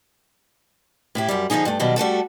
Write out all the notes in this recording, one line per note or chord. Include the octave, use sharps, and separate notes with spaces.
A2 E4 G4
F#2 G3
D3 F3 F#3 D#4 G#4
G2 A3
B2 D#3 F#3 G3
G3 A3 F#4 A4